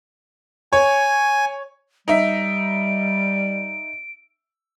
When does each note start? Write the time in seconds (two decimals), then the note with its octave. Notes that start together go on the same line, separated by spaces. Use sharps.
0.73 C#5 G#5
2.08 G3 D#4 E5 D7